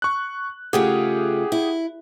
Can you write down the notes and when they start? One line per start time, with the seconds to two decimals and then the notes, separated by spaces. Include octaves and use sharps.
0.02 C#6 F#6
0.73 C#3 A3 F4 G4 G#4 F#5
1.52 E4